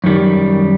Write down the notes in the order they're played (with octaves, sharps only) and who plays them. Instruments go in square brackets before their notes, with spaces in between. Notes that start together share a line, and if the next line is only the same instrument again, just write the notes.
[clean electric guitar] F#2 D#3 G3